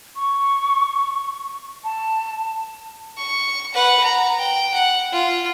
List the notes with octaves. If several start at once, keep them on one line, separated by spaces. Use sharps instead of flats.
C#6
A5
C#6
B4 F#5
A#5
G5
F#5
F4